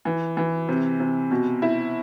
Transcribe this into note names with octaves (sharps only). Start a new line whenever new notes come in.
E3
E3
C3
C3
B2
E4